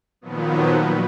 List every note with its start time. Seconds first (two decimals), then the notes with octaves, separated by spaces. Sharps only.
0.21 A#2 D#3 F3 F#3 B3
0.74 B4